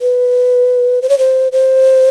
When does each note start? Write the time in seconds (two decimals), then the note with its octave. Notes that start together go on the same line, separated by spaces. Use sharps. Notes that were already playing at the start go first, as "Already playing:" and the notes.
0.01 B4
1.02 C5
1.09 C#5
1.19 C5
1.52 C5